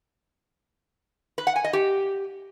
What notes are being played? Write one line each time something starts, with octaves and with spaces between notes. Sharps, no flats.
B4
F#5
G#5
D#5
G4